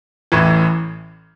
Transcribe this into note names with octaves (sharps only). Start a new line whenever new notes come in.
A1 A2 E3